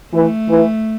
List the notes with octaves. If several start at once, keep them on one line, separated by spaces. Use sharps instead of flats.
E3 A3
E3